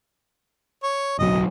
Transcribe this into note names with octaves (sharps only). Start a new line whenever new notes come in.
C#5
D1 B1 F#3 D#5